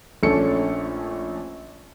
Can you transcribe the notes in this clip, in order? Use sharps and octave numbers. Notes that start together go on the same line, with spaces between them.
A#1 A3 C#4 D4 A4 C#7